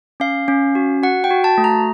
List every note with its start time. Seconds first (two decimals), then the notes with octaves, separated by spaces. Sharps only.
0.20 C#4 F5
0.48 C#4
0.75 F#4
1.03 F#4 F#5
1.24 G5
1.30 F#4
1.44 A5
1.58 A3
1.64 A#5